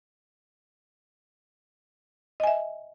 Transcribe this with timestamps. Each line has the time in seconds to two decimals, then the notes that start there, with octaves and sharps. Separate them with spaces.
2.40 D#5
2.44 G#5
2.47 E5